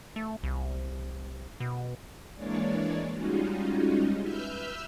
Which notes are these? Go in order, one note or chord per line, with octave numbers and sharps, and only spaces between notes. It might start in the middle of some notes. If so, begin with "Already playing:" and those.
A3
C2
B2
E3 G#3 A#3 D4 C#5 D5
G3 G#3 C#4 D#4 F4 F#4
B4 E5 E6 F6 G6